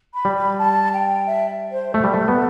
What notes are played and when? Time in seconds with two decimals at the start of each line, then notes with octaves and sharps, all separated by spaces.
0.13 B5
0.25 G3
0.36 B5
0.58 A5
0.92 G5
1.26 E5
1.71 C5
1.93 A3 A4
2.04 G3
2.14 A3
2.28 B3